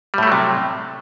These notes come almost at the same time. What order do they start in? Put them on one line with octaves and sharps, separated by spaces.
G3 A2 A3 F#3 C3